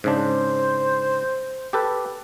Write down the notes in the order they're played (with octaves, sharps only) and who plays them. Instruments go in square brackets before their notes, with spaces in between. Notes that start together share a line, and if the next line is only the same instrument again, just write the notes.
[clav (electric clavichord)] G#2 C#3 D4 [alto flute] C5
[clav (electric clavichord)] G4 A4 B4